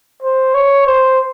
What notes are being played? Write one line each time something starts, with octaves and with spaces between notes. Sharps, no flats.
C5
C#5
C5